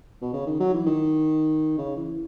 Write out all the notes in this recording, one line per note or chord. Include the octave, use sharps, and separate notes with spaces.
B2
C#3
D#3
F#3
E3
D#3
C#3
E3